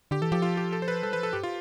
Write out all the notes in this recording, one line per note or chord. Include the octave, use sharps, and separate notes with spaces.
D3 G4
E3 A4
F3 G4
F4
G4
A4
C5
B4
G3 A4
E3 B4
F3 A4
G2 G4
F4